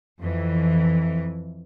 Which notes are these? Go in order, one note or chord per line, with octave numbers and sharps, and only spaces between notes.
F2 E3